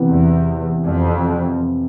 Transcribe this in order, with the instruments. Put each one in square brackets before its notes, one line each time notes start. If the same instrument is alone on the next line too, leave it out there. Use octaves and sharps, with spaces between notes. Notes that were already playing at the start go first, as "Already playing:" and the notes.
Already playing: [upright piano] C3 E3 B3
[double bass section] E2
F2